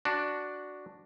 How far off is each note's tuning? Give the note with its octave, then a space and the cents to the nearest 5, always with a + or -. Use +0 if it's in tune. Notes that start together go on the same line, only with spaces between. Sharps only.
D4 +0 F#4 +0